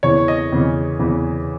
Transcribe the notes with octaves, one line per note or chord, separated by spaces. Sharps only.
E2 C#3 E3 C#5
D#5
E2 C#3 E3
E2 C#3 E3